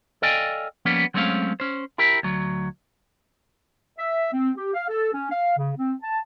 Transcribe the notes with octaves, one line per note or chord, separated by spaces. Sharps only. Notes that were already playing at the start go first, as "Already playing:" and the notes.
A4 D5 D#5 F5 G5 G#5
F3 G3 A#3 B3 C#4
F#3 G#3 A3 C4 C#4 F5
C#4 C5
E4 G4 A#4
D2 F#3
E5
C4
G4
F5
A4
C#4
F5
C#3
C4
A5